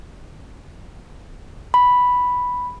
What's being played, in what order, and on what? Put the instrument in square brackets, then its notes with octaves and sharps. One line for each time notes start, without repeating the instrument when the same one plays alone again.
[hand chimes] B5